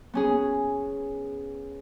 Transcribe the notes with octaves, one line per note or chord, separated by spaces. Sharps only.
B3 C#4 G#4